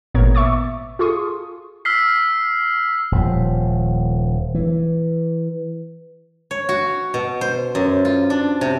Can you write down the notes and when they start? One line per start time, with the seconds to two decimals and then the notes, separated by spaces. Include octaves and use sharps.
0.14 G#1 A#2 B3 A#4 C#5 G#6
0.35 E5 C#6 D6 A6
0.99 F4 G#4 A4 C6 C#6 D#6
1.85 E6 F6 B6 C7
3.12 D#1 F3
4.54 E3
6.51 C#5
6.69 F#4
7.14 B2
7.41 C5
7.75 F#2
8.05 F4
8.30 D4
8.61 C3